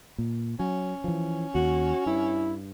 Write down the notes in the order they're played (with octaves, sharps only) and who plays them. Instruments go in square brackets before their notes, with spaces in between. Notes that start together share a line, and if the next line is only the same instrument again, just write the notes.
[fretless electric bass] A#2
[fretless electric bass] F#3 [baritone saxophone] C#4
[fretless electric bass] E3 F3
[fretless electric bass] D#2 [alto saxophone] F#4
[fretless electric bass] G2 [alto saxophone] E4